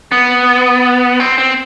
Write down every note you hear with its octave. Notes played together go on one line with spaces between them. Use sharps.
B3
C4
C4